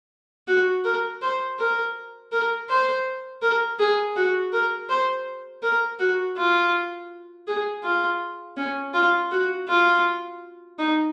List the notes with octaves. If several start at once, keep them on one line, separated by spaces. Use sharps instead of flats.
F#4
A#4
C5
A#4
A#4
C5
A#4
G#4
F#4
A#4
C5
A#4
F#4
F4
G#4
F4
C#4
F4
F#4
F4
D#4